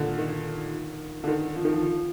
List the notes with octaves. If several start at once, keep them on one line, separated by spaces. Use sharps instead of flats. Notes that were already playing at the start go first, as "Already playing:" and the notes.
Already playing: A#2 D3 D#3
D#3
D3
D#3
F3
D#3
F3
F3